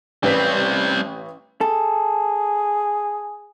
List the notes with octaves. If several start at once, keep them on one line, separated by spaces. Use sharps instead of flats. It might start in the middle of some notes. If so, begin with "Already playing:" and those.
A1 G3 C4 B4 B6
G#4 A4